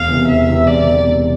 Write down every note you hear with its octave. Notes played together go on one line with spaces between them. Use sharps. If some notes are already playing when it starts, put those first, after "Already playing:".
Already playing: E1 F5
E2 C3
E1 E5
E2 C3
E1 D5
E2 C3
E1